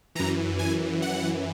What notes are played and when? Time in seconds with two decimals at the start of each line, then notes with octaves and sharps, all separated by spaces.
0.15 F#2 E3 A#5
0.59 G#5
1.02 F#5